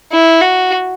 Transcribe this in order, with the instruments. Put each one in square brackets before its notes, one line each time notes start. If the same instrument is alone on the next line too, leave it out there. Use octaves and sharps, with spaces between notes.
[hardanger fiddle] E4
F#4